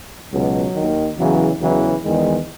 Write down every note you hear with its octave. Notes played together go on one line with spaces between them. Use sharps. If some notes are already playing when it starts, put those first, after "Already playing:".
C#2 B2 F#3
D#2 D#3
E2 C#3 E3 F#3
E2 C#3 E3 F#3
E2 D#3 G#3